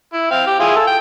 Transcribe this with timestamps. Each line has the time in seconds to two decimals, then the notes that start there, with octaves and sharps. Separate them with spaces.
0.14 E4
0.31 C4 F5
0.47 G4
0.60 E4 F4 G#4
0.76 A4
0.87 G5